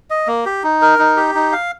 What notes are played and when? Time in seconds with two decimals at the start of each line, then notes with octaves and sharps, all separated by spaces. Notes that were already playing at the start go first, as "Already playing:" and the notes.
0.10 D#5
0.27 A#3
0.46 G4
0.63 D#4
0.82 A#4
0.99 D#4
1.17 G4
1.35 D#4
1.52 F5